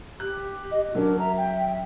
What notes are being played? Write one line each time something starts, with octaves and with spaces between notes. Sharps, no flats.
G4 F#6
D#5
F#3 C#4 D4 A#4
E5 A#5
G5